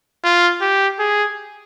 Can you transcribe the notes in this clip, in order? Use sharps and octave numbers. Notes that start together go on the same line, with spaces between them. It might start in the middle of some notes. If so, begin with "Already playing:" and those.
F4
G4
G#4